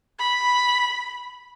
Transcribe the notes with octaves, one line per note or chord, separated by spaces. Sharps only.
B5